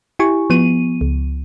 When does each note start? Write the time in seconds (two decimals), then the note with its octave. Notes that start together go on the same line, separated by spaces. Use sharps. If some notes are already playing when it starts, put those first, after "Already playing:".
0.19 E4 G4 G#5 C#6
0.50 F3 B3 D#7
1.01 C#2